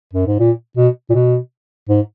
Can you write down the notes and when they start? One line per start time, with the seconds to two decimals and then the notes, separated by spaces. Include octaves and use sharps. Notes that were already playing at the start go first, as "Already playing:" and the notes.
0.13 F#2
0.27 G#2
0.40 A#2
0.77 B2
1.10 A#2
1.15 B2
1.89 G#2